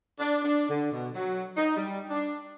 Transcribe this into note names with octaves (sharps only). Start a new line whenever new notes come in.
D4
D4
D3
B2
F#3
D#4
G3
D4